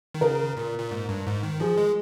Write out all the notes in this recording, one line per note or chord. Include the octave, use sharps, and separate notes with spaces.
D#3
C#3 A#4
A#2
A#2
G#2
G2
G#2
D#3
F3 G#4
G#3